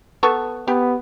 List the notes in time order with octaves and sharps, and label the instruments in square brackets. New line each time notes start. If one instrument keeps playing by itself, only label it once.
[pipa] B3 A4 C#6
[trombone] B3 [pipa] G4